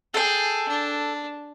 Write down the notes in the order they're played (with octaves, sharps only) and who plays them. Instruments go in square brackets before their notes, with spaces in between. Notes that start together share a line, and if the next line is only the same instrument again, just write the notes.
[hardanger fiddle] G#4 [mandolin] A4 G5
[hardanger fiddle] D4